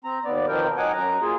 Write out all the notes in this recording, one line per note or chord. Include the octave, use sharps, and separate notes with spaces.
C4 A#5
D#2 B3 D5
B2 D#3 F3 C4 A#4 G5
F#3 D#4 F#5 G#5 D6
F#2 A#5
A#3 F4 G#4